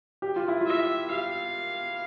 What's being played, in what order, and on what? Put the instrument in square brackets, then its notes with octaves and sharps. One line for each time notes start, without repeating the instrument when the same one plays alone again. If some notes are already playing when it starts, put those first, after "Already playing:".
[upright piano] G4
F4
E4
F4
[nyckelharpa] E5
[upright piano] G4 [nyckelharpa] F5